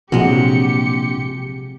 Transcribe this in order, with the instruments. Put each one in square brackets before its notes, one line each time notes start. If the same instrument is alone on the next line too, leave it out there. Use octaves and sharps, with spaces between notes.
[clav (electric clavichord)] A#1 [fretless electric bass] C3 [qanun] F#3 G#3 [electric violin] G4 C#7